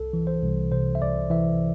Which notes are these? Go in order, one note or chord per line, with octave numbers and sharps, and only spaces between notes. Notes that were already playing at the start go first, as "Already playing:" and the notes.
Already playing: C2 A4
E3
C5
C2
C3 C5
E5
C2 D5
E3 E5